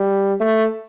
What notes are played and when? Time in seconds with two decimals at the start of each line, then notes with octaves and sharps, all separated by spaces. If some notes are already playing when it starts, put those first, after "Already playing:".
Already playing: G3
0.40 A3